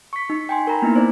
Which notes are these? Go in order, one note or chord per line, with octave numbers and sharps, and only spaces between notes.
C#6 B6
D#4
G5 G#5 C6
A#4 A#5 B5
A#3 B3 D#4 E4
D#4 C5 D5